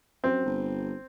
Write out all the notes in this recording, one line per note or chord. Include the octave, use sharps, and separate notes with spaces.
F#2 C4
G1